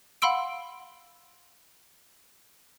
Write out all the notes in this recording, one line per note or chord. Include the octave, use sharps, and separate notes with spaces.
F5 F#5 B5 C6 E6 D7